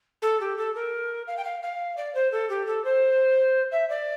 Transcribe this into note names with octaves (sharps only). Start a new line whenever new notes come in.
A4
G4
A4
A#4
F5
G5
F5
F5
D5
C5
A4
G4
A4
C5
E5
D5